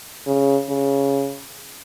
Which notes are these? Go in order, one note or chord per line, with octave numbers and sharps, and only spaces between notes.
C#3
C#3